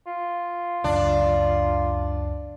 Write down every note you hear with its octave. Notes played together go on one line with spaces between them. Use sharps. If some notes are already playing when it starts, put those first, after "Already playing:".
F4
C#2 F#2 C#3 D4